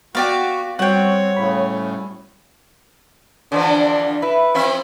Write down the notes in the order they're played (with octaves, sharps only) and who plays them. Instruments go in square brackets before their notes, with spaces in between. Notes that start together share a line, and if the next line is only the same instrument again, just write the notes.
[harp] B3 [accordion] F#4 [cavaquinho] G4 D5 F5
[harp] G3 F#4 C5 [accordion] C4 [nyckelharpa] C#5 [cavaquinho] F#5 G5
[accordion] A2 C#3 [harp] B5
[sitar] D3 E3 F3 [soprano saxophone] D4
[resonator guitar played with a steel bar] E4 [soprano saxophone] B4
[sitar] F3 C4 E5